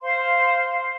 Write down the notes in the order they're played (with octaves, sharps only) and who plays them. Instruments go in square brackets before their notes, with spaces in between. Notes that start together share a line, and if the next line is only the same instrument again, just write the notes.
[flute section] C5 F5 C6